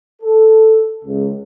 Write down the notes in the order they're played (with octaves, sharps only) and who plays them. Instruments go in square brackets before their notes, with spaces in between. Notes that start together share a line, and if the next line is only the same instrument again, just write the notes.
[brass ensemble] A4
C#2